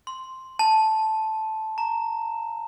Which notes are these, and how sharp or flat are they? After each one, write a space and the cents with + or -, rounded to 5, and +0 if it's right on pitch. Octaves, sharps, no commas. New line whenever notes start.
C6 +0
A5 -5
A#5 -15